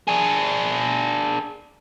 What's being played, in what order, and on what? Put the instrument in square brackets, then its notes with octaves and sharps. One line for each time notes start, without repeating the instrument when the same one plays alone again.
[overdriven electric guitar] D4 G#4